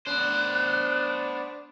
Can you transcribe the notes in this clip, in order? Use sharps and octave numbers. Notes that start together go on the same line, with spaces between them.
B3 D4 C5 F#6